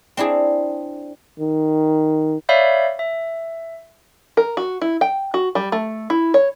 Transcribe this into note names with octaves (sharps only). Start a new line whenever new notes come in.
C4 D4 E4 G#4
D#3
C#5 D5 E5 F5 B5 G6
E5
A#4
F#4
E4
G5
F#4
G3
A3
E4
C#5